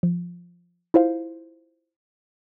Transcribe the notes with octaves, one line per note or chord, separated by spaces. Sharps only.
F3
E4 F4 C5 F5